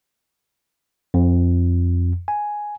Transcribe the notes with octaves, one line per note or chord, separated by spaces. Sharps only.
F2
G#5